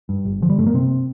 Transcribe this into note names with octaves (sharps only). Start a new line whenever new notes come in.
G2
G1
D3 F3
G3
G2 A3
A#3
C3 C4